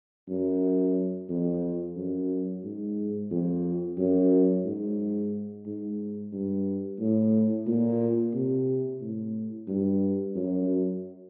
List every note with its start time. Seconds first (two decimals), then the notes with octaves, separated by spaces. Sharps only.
0.28 F#2
1.29 F2
1.96 F#2
2.64 G#2
3.31 F2
3.98 F#2
4.65 G#2
5.66 G#2
6.33 G2
7.00 A2
7.67 A#2
8.34 C3
9.01 A2
9.68 G2
10.35 F#2